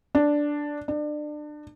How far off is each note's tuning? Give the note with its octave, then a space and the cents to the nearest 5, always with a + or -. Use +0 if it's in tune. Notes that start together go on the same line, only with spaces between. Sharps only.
D4 +0
D4 +30